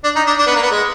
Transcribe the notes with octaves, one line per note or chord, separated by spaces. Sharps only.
D4
D#4
D4
D4
B3
A#3
B3
G#3